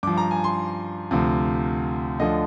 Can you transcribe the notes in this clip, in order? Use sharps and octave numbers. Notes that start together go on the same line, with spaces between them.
G2 F3 D6
A#5
G#5
C6
D2 C3 F3
D2 D3 F3 D#5